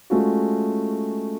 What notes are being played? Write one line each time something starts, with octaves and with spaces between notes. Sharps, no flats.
G#3 A3 C#4 F4 F#4